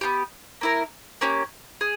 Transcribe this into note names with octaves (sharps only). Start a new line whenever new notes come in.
B3 D#4 G4
A#3 E4 A#4
A#3 C#4 G4
G#4